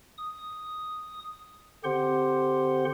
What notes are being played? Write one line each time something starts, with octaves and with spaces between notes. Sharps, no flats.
D#6
D3 C4 G4 C5 F#5 C6